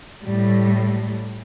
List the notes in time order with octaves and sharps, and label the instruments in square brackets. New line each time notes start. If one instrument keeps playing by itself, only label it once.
[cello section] A2 G3